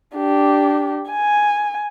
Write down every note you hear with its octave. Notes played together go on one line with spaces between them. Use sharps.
D4 G4
G#5